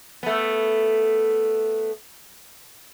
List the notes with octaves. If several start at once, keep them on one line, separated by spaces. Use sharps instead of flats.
A3 B3